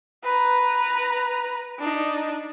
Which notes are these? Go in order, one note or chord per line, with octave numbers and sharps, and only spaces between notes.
B4 A#5
D4 D#4